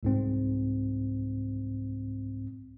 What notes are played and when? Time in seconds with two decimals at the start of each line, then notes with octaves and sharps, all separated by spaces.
0.03 C2 G#2 C4